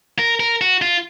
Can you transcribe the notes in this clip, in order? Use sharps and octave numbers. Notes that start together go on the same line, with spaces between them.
A#4
A#4
F#4
F4